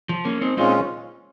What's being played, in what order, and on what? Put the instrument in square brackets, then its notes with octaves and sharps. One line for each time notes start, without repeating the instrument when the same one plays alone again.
[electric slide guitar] F3
A#3 C#4
C4 D#4
[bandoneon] A#2 G#3 C#4 F4 [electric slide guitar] C4 D#4